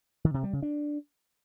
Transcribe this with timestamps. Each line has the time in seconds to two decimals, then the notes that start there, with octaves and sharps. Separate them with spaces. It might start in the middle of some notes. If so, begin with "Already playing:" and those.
0.25 D#3
0.34 C3
0.43 G3
0.53 C#3
0.62 D4